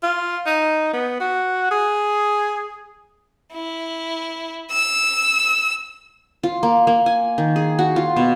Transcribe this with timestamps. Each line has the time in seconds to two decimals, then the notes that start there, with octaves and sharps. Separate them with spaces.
0.03 F4
0.46 D#4
0.94 B3
1.20 F#4
1.71 G#4
3.54 E4
4.71 E6
6.43 F4
6.63 A#3
6.87 A#3
7.06 G#5
7.38 D#3
7.56 G#4
7.79 F#4
7.96 F4
8.16 B2